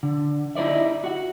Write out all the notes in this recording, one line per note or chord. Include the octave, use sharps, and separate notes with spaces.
D3
D#4 E4 C#5 D5 E5
F#4 F#5